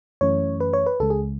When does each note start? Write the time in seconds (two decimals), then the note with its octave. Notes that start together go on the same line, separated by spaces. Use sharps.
0.21 F#2 E3 A3 C#4 C#5
0.60 B4
0.73 C#5
0.86 B4
1.00 C#2 C#3 G#3 A4
1.10 G#4